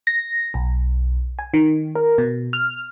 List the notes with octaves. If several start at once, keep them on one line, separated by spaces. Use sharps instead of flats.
A#6
B1
G#5
D#3
A#4
B2
F6